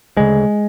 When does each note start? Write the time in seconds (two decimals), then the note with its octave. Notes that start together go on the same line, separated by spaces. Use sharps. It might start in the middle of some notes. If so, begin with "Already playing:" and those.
0.17 D2 C#3 G#3